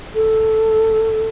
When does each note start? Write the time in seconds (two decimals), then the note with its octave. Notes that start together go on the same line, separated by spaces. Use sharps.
0.15 A4